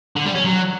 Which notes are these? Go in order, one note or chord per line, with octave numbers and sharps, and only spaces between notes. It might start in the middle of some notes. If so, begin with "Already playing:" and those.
D3
G3
C#4
F#3